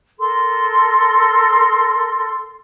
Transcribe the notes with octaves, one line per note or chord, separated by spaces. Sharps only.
A4 A#4 C6